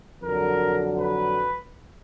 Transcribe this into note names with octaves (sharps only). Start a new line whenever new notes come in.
F2 D3 F#3 A#4
B4